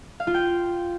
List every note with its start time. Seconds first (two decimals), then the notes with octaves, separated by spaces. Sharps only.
0.20 F5
0.27 F4
0.34 G5